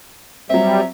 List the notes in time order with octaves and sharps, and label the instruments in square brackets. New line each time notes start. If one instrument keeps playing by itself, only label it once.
[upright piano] F#3 C4 [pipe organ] G3 [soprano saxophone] E5